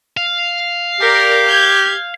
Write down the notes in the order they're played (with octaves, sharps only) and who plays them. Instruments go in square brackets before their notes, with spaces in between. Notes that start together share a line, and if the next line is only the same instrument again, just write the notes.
[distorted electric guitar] F5
[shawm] G4 [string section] A#4 D5
[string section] G6 G#6